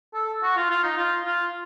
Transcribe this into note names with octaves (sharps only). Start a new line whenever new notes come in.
A4
F#4
F4
F4
D#4
F4
F4